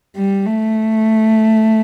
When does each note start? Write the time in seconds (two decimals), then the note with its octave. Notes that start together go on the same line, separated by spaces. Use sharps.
0.16 G3
0.46 A3